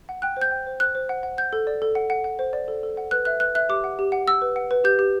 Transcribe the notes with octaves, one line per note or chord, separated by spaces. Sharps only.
F#5
G5 F#6
C5 G6
G5
C5
C5 F#6
C5
F#5
F#5
F#5 G6
A4
D5
A4
F#5
F#5
F#5
C5
D5
A4
A4
F#5
B4 F#6
E5 F#6
B4 F#6
E5 F#6
G4 D6
F#5
G4
F#5
F#5 E6
B4
F#5
B4
G4 G6
G4